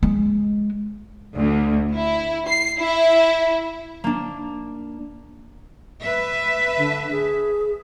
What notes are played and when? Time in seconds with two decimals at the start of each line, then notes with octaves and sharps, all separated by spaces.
0.03 G#3
1.36 D2
1.94 E4
2.48 C7
2.79 E4
4.04 A#3 D4
6.01 B4 E5
6.77 D3
7.11 G#4